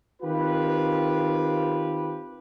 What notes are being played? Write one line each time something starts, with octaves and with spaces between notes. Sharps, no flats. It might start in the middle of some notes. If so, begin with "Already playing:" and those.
D#3 C4 F4 G4 B4